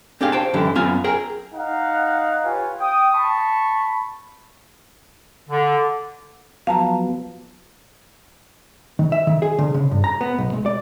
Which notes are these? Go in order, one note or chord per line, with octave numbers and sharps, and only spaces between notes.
C4 D4 G4 G#4 F5 G5
C5 G5 A5
F#2 D3 E3 E4 G4
F#2 B3 C4 F4 F5 G#5
G#4 A#4 G5
D#4 F5 F#5
F4 G4 B4 C#5 F5 G#5
G5 D#6
A5 B5 C#6
D3
F3 F#3 B3 F5 A5 A#5
D#3
E5
D#3
G#4
D3
C#3
G2
A#5
B3
B1
G#3
D5